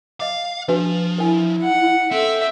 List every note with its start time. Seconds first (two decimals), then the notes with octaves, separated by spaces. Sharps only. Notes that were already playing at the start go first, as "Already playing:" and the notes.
0.20 D#5 F5 D6
0.68 F3 D4 F#4 B4
1.18 E4 A#4 G#5
1.62 F#5
2.12 C4 A4 E5